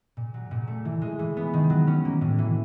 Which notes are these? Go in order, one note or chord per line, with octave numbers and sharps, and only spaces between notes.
A#2
F#3
A#2
A3
E3
G#3
E3
B3
D#3
F#3
C#4
A#3
A2
E3